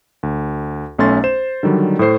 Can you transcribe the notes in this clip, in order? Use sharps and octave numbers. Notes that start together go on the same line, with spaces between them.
D2
B1 A3 C#4 C6 A6
C5 E7
D3 D#3 F#3 G3
A2 A3 C5 C7